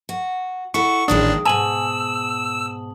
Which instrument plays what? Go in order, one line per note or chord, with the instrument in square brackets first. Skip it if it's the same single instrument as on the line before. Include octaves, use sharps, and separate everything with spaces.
[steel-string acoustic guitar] F#4
[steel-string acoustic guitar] E4 F#4 A4 [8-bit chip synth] C#6
[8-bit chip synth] A1 D4 [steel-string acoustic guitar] A#2 D#3 G#3 [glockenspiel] D#6
[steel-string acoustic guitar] G#2 B2 [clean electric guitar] G#5 [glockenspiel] A5 F#7 [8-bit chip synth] E6